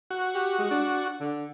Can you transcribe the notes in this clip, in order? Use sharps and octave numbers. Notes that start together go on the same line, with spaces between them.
F#4
G4
G#3
D4
D3